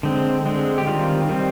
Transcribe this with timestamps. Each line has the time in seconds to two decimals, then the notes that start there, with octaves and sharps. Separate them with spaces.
0.03 D3 G#3 C4
0.46 D3 G#3 C4
0.78 G4
0.87 D#3 G3 C4 F4
1.29 D#3 G3 C4